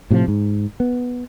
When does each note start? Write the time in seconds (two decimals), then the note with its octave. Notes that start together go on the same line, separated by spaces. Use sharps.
0.10 A2 C3 D#3 F3
0.28 G#2
0.80 B3